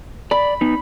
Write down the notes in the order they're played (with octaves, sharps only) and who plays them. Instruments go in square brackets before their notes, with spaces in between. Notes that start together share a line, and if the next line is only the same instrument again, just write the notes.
[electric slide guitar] D5 [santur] B5
[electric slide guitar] B3 D#4